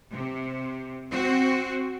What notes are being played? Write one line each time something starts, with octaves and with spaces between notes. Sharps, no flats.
C3
C4 F#4